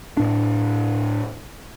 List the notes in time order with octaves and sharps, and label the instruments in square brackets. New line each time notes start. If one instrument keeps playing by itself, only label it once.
[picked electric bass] A2 D4